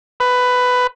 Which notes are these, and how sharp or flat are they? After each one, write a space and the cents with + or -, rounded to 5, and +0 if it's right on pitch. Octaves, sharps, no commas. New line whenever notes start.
B4 +10